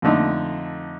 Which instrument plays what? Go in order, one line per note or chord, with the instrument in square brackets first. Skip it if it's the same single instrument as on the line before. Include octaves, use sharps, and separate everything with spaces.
[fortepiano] F2 D3 A3 D#4